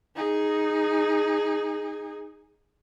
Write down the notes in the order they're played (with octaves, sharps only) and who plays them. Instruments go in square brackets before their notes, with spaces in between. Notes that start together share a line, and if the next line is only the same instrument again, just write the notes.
[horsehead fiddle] D#4 G#4